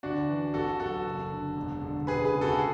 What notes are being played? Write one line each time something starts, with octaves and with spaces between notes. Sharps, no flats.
D2 D4 F#4
E3
A1 F#4 A4
F#3 F#4 A4
F#1
D3
E1
D3
E1 G#4 B4
G#4 B4
C#3
F#4 A4
F#4
G#4